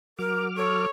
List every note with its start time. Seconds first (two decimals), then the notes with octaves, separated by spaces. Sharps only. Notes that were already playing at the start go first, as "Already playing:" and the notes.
0.19 F#3 A#4 D6 F6
0.56 A4 C#5